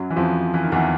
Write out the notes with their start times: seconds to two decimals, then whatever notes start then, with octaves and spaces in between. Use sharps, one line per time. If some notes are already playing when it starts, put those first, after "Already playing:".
Already playing: F#2 F#3
0.10 E3
0.16 F2 F3
0.54 E3
0.63 D#3
0.72 E2 E3